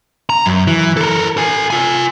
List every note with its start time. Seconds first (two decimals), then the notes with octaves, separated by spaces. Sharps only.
0.30 A#5
0.46 F#2
0.67 E3
0.97 A4 A#4
1.37 A4 G#5
1.70 F4 G#5